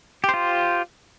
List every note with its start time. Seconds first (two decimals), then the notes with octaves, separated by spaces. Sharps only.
0.24 G4
0.29 C5
0.34 F4